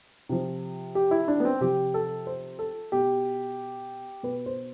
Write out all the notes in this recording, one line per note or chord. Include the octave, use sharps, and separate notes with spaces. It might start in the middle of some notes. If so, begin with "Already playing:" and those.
C3 F3
G4
E4
D4
B3
C4
C3 F3 G4
A4
C5
A4
B2 G4
B2 B4
C5